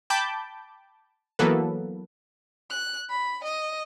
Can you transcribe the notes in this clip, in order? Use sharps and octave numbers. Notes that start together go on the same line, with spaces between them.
G5 A5 B5 D6 G6
E3 F#3 A#3 B3 A4 B4
F#6
B5
D#5